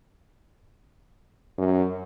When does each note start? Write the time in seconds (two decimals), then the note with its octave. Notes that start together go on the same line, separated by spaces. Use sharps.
1.58 F#2